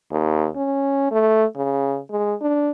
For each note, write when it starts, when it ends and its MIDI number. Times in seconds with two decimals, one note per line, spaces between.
0.12 0.48 39
0.56 1.09 61
1.11 1.45 57
1.56 1.98 49
2.11 2.34 56
2.41 2.71 62